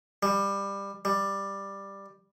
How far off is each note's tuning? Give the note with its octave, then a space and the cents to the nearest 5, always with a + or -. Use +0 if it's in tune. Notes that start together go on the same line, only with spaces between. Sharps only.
G3 +20
G3 +10